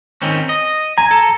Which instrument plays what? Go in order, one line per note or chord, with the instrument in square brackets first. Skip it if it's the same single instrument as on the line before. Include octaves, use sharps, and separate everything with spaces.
[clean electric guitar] D#3 C4 C#4
D#5
[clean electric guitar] G#5 [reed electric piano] A#5
[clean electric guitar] A4